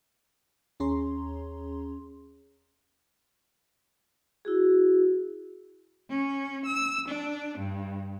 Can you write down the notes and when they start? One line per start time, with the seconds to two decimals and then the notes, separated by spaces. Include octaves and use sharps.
0.80 D#2 C#4 G#4 C#5 A#5 C6
4.45 E4 F#4 G#4
6.10 C#4
6.66 E6
7.08 D4
7.58 G2